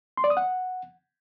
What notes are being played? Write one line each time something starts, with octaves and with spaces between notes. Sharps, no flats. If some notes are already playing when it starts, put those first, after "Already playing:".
C6
D5
D#6
F#5